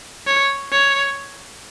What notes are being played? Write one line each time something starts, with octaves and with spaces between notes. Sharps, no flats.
C#5
C#5